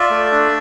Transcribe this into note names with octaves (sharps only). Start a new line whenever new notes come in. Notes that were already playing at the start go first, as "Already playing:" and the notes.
Already playing: F4 D5 E5
A3
D4